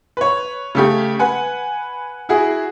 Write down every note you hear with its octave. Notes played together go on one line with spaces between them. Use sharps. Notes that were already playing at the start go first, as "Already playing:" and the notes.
B4 C#5
C#3 A3 G4
B4 F#5 G#5
E4 F#4 G#4